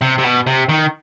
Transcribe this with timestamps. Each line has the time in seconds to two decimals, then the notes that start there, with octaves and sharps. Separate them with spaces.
0.01 C3
0.18 C3
0.23 B2
0.47 C3
0.69 D#3